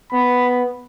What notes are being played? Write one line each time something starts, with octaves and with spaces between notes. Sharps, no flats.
B3 B5